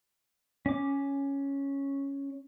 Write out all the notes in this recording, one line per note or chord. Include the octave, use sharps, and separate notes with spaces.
C#4 D6